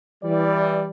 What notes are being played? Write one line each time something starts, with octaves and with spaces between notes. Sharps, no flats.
E3 G3 D5